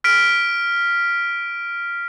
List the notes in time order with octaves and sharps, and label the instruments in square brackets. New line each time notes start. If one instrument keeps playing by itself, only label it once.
[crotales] F6 B6 D7